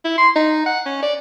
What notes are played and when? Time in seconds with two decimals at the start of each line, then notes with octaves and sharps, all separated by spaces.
0.05 E4
0.18 C6
0.36 D#4
0.66 F#5
0.86 C#4
1.03 D5